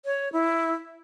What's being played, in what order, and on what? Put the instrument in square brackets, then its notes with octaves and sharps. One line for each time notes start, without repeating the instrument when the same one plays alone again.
[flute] C#5
E4